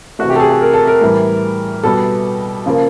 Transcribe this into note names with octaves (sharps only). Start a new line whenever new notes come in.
C3 E3 A3 F#4
G4
A4
G#4
A4
A#4
A4
A#4
A2 E3 G3
B2 G3 B3 A4
C#3 F3 A#3